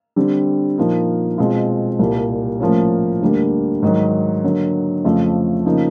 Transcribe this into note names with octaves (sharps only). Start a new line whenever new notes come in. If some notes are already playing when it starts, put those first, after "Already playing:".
D3 G3 C4
A#2 F3 A#3 D#4
B2 G#3 C4 F4
C2 A#2 G3
A2 F3 A#3 C#4
D2 D3 G3 A#3
G#2 D#3 F#3
D3 F#3 A#3
F2 C#3 F3 A3
C#3 F3 A#3 D#4